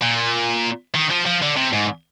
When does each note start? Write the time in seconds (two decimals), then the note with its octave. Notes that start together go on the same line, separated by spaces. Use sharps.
0.02 A#2
0.95 D#3
1.11 F3
1.26 F3
1.42 D3
1.57 C3
1.73 G#2